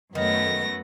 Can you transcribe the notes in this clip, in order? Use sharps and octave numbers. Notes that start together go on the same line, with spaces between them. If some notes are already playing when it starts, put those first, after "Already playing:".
F#2 D#3 A3 B3 A#6